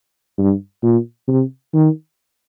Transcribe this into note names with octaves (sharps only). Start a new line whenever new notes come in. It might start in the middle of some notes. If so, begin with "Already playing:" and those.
G2
A#2
C3
D#3